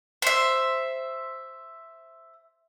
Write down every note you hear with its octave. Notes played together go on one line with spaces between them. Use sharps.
C5 E5